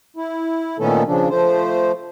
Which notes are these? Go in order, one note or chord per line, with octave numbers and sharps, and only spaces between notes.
E4
A#2 D#3 A3 B3 C#4 A4
C#3 F3 D4
F3 A3 C5